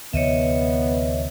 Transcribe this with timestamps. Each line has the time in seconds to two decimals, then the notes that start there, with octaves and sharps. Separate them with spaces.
0.13 D2 C3 E3 B3 C#5 D#5 E5